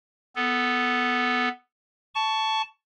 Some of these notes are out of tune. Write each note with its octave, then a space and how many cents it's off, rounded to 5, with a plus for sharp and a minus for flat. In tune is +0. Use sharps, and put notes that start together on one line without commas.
B3 +5 A4 +0
A5 +0 C#6 +15